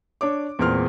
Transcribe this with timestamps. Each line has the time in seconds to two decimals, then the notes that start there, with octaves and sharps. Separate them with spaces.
0.21 D4 C#5 D6
0.59 E2 A#2 G#3 C4 C6 F6